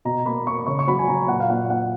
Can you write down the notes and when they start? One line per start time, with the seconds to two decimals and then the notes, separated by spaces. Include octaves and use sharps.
0.05 B2 A#5
0.25 A#3 B5
0.46 A#3 C#6
0.67 C#3 C#6
0.79 C#6
0.87 F#3 B5
0.99 G#5
1.08 F#3 A#5
1.28 A#2 F#5
1.40 F5
1.49 A#2 F#5
1.70 A#2 F#5